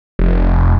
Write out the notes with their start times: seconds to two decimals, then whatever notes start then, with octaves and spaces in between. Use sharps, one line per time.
0.19 F1